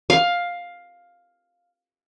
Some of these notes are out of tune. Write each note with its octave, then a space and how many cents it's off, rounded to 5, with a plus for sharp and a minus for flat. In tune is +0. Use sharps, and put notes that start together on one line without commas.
F5 +10